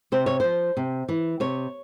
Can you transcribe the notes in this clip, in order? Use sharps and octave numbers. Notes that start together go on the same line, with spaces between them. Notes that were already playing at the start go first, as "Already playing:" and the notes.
C3 C5
C#5
F3 C5
C3
E3
C3 C#5